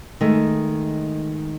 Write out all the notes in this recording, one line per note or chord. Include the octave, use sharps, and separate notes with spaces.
D#3 G#3 A3